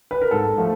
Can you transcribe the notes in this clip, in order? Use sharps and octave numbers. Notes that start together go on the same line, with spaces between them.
B4
A#4
G#2 A4
F3 A3